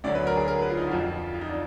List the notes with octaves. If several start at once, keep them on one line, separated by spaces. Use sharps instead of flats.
D2 D3 F#3 D5
B4
A#4
G#4
A#4
B4
F4
D#4
F#4
F2 F3 F4
F4
D#4
D4